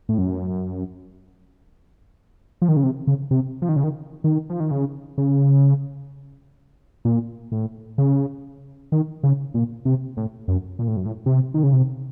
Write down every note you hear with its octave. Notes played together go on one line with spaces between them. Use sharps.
A2
F#2
F3
D#3
C#3
C3
C#3
C3
F3
D#3
C#3
D#3
D#3
F3
D#3
C#3
C#3
A#2
A2
C#3
D#3
C#3
A#2
C3
A2
F#2
A#2
A2
F#2
A2
C3
D#3
C#3
C3